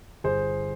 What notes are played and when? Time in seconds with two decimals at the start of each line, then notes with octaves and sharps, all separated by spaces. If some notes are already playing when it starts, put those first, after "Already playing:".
0.24 G1 G#4 C5